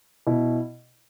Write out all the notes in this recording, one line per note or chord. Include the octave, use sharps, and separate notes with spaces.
B2 E4